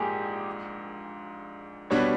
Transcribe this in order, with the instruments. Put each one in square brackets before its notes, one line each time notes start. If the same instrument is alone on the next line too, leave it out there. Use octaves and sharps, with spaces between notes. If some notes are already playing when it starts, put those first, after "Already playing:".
Already playing: [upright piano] A#1 G#2 F3 A#3 [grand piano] G4 G#4
[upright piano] B2 G3 B3 D4 [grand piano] C#5